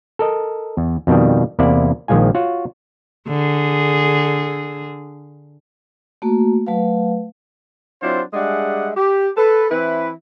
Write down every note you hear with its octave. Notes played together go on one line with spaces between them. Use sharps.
A4 A#4 D#5
E2
F2 B2 D#3 G3
E2 C3 A#3 E4 D5
A#1 D#3 F3 G#3 F4 G#5
F4 F#4 C#5 F#5
D3 G#4
A3 A#3 F#4
F#3 A3 B4 F5
F#3 C4 D4 E4 F4 C5
G3 G#3 D4 G#4 E5 F#5
G4
A4 B4
E3 C4 E4 B4